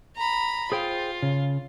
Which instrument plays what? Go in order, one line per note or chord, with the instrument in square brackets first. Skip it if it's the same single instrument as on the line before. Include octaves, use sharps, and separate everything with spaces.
[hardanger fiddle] A#5 B5
[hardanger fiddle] F4 [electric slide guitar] G#4 C5 G5
[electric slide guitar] C#3